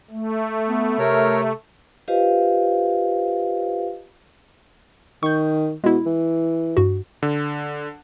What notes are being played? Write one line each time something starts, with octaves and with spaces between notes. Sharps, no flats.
A3
B3
C3 A#4 C#5 F6
F4 G4 B4 C5 D#5 F5
D#3 C#6 G6
B2 G#3 E4
E3
G2 F#4
D3